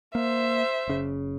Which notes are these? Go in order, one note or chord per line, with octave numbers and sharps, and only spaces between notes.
A#3 C5 E5
F#1 C#3